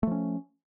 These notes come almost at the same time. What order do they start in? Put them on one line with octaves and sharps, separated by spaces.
A3 F3 C#4